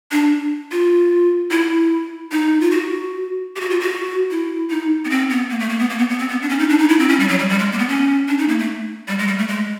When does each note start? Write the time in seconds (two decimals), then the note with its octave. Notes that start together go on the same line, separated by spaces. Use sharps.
0.12 D4
0.71 F4
1.51 E4
2.32 D#4
2.61 F4
2.71 F#4
3.56 G4
3.61 F#4
3.70 F4
3.80 F#4
4.31 E4
4.70 D#4
5.05 B3
5.10 C4
5.30 B3
5.50 A#3
5.60 A3
5.69 A#3
5.79 B3
5.90 A#3
5.99 B3
6.10 B3
6.19 C4
6.29 B3
6.42 D4
6.49 C#4
6.59 D#4
6.69 D4
6.79 D#4
6.89 E4
6.99 C4
7.09 C#4
7.20 G3
7.29 F#3
7.39 G3
7.49 G3
7.59 G#3
7.72 A#3
7.79 B3
7.89 C#4
8.28 D4
8.38 D#4
8.48 A#3
8.59 A3
9.08 G3
9.19 G#3
9.28 G3
9.38 A3
9.48 G#3